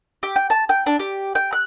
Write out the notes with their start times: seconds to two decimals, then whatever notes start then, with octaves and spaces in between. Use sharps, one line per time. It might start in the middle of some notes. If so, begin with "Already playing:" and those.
0.23 G4
0.36 G5
0.50 A5
0.69 G5
0.86 D4
0.99 G4
1.35 G5
1.53 F#6